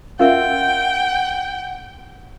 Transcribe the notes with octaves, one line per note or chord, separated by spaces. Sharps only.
C#4 F4 A#4 E5 F#5 G5